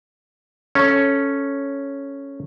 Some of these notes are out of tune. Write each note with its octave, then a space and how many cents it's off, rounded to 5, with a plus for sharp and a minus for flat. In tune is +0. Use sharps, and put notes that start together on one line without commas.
C#4 +0 A4 -5